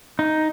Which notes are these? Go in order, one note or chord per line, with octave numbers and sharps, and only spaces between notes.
D#4